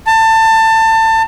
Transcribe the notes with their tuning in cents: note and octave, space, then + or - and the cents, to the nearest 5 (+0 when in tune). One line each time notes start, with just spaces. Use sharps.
A5 +25